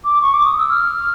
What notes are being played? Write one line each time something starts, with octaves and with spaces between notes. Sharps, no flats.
D6
C#6
D6
D#6
E6
F6